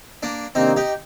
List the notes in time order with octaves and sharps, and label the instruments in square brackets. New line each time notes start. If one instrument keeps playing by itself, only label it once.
[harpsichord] A#3 D4
[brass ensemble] C3 D#3 A#3 D4 [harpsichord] C4 D#4
[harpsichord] D#4 G4